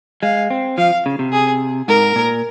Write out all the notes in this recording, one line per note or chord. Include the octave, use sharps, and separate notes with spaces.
G#3 F5
C4
F3 F5
C#3
C3
G#4
G#2 A#4
A#2